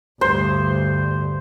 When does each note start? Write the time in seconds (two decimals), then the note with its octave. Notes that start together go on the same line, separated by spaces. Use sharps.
0.21 D2 G2 C5